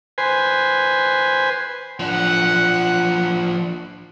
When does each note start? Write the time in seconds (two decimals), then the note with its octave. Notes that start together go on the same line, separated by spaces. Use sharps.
0.18 B4 C5 G#5
2.00 F3 D4 F#5